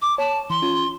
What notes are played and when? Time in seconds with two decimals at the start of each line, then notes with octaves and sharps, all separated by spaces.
0.02 D6
0.18 C#5 A5
0.50 E3 C6
0.62 C#4 F4